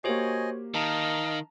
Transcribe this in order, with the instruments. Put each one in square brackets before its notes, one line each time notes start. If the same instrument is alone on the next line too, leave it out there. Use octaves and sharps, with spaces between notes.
[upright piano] A#3 G4 [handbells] F#4 C5 C#5 [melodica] D#5 G#5
[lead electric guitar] D#3 [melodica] D#5 F5 [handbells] A5 A#5